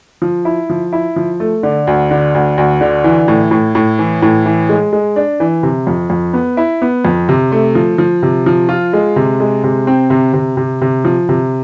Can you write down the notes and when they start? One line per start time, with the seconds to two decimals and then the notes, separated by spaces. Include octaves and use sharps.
0.22 F3
0.45 E4
0.70 F3
0.93 E4
1.16 F3
1.40 A3
1.63 D3
1.87 D2
2.11 D3
2.35 D2
2.58 D2
2.81 D3
3.04 E3
3.28 A2
3.51 A2
3.75 A2
3.99 E3
4.22 A2
4.46 E3
4.69 G#3
4.93 G#3
5.16 D4
5.40 E3
5.63 C3
5.87 F2
6.10 F2
6.33 B3
6.57 E4
6.82 B3
7.05 F2
7.29 C3
7.52 A3
7.75 F3
7.98 F3
8.23 C3
8.46 F3
8.69 F4
8.93 G#3
9.16 C3
9.40 G#3
9.64 C3
9.87 C4
10.10 C3
10.33 C3
10.57 C3
10.81 C3
11.05 F3
11.29 C3